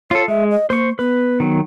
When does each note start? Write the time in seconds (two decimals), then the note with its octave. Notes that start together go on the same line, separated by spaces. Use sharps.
0.11 F4 A4 C#5
0.28 G#3 E5
0.51 D#5
0.70 A#3 C5 C#6
0.99 B3 B4
1.40 D#3 F#3